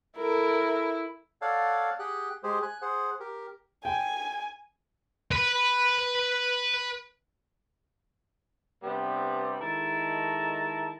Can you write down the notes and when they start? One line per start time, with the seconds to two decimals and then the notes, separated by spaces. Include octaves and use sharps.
0.18 E4 A4 A#4
1.42 A4 C#5 D5 F5 F#5 A5
1.99 G4 G#4 F#5 G5 F#6
2.43 G#3 G4 G#4 C5
2.62 G#5 F#6
2.82 G#4 C5 F#5
3.20 G4 A#4
3.85 G5 G#5
5.31 B4 B5
8.83 G2 C3 G3 B3 G4
9.61 D#3 G#3 E4 A4 A5 A#5